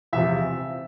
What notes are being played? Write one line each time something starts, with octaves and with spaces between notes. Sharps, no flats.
E2 C3 F3 E5